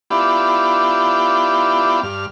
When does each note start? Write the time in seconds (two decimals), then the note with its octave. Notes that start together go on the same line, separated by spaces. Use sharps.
0.11 B3 D4 E4 F4 G4
2.03 G2 F6